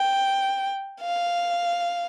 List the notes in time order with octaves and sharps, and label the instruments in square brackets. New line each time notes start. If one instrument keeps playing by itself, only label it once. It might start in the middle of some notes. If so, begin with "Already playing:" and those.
Already playing: [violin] G5
F5